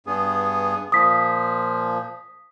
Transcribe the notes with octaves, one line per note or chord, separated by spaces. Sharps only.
G2 B3 G#4
A#2 F3 D#6 B6